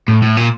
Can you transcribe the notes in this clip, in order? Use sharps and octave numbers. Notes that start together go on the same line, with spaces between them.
A2
A2
A#2